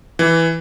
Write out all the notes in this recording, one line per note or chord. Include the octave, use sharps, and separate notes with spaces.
E3